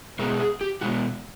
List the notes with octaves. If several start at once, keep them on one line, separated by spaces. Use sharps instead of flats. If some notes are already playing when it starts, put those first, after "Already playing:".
B2 G#3 B3 A#4
G#4
G4
B2 G#3 B3 F#4